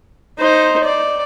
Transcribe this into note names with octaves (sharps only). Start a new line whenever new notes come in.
D#4 C5
D5